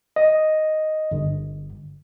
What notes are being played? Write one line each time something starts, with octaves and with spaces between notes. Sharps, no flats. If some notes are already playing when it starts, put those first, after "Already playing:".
D#5
G1